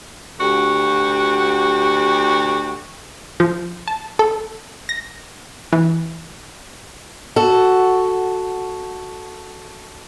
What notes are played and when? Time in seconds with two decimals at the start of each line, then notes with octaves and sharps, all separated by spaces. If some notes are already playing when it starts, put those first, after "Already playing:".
0.40 D2 F#4 G4
3.40 F3
3.88 A5
4.19 A4
4.89 A#6
5.73 E3
7.36 F#4 A4